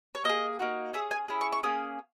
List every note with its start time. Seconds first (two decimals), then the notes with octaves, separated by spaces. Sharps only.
0.15 C#5
0.24 A#3 E4 D#5
0.29 G#4
0.59 A#3 D#4 F#4
0.93 C#4 G#4 E5
1.11 G#5
1.28 C#4 E4 G#4
1.41 C#6
1.52 C#6
1.63 A#3 C#4 G#4 D#6